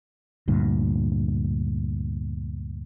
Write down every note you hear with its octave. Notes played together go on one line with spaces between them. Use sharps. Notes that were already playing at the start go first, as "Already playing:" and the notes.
D2 G2 A#2